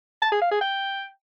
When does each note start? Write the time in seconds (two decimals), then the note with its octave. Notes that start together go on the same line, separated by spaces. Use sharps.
0.22 A5
0.32 G#4
0.41 F5
0.51 G#4
0.61 G5